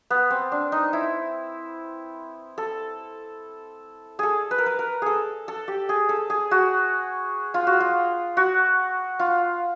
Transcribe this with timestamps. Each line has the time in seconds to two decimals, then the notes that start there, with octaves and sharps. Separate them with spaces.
0.10 B3
0.30 C4
0.52 D4
0.72 D#4
0.93 E4
2.58 A4
4.19 G#4 A4
4.51 B4
4.58 A#4
4.66 B4
4.79 A#4
5.02 G#4 A4
5.48 A4
5.68 G4
5.89 G#4
6.09 A4
6.30 G#4
6.51 F#4
7.54 F4
7.67 F#4
7.80 F4
8.37 F#4
9.19 F4